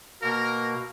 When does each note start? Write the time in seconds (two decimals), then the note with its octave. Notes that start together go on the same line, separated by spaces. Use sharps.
0.22 B2 A#3 A#4